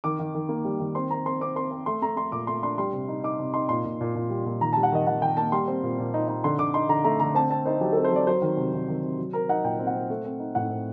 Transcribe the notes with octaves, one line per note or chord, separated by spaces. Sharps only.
D#3 D6
D#3
D#3
A#3
G3
D#3
C4 C6
C4 A#5
C4 C6
C4 D6
C4 C6
C4
A3 C6
A3 A#5
A3 C6
A#2 D6
A3 C6
D4 C6
G3 C6
C3
D#4
D#4 D6
C3
D#4 C6
A#2 C6
A#2
A#2
A#2
G3
A#2
D#3 A#5
A5
G3
F#5
D#3 D#5
D#3 F#5
D#3 G5
A#3 A5
G3 C6
C4
A#2
A#2
D#4
D#4
D3 C6
D3 D6
D#4 C6
D3 A#5
A3 A#5
D3 A#5
C4 A5
C4 A5
D#4 C5
F#3 G4
A4
C4
C5
F#3 D5
F#3 C5
D#3
C3
D#3
D#3
C3
F#3
C4 A#4
D#4 F#5
A#2 G5
C4
F#5
C4
A3
C4
D#4
A2 F#5
C4